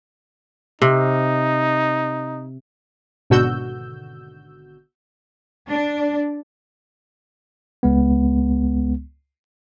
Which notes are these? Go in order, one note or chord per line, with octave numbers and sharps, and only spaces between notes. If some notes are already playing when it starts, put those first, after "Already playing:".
C3 D#4
G#1 B2 D3 F#4 E6 G6
D4
C#2 G#3 B3